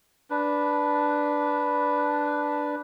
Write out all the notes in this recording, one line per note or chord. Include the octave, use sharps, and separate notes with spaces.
D4 B4